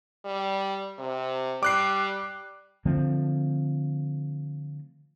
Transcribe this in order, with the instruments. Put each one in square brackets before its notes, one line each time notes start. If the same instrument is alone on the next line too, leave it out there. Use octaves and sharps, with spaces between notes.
[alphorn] G3
C3
[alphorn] G3 [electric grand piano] D6 F#6 C7
[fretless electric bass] D3 F3 A3 C4